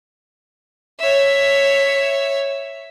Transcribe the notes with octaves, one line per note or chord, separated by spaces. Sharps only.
C#5 E5